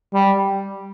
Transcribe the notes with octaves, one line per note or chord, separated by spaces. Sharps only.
G3